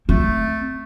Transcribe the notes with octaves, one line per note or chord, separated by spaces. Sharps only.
A3 C4